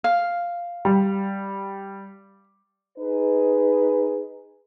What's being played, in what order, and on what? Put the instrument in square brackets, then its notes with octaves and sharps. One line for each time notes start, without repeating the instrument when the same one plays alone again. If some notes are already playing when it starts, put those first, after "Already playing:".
[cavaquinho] F5
[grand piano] G3
[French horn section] D#4 G#4 B4